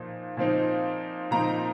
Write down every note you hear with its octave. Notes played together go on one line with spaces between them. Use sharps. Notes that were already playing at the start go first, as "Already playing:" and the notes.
Already playing: A#2 F3 D#4
A#2 F3 C4 D#4
A#2 F3 C4 D#4 A#5